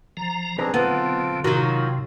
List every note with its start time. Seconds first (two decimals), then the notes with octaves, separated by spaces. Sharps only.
0.17 F3 A#5
0.58 B1 C4 D4 G#4 B4 A#5
0.74 D3 B3 C4 F4 A4
1.44 A2 C3 D#3 F#3 F4 F#4